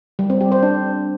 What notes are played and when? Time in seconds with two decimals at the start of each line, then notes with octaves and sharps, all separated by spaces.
0.19 G3
0.30 C4
0.41 G4
0.52 C5
0.63 D4